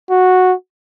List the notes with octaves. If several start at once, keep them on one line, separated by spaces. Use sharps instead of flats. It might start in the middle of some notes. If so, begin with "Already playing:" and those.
F#4